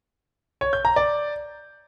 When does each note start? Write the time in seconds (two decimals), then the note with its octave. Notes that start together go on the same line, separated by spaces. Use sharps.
0.61 C#5
0.73 G6
0.85 A#5
0.96 D5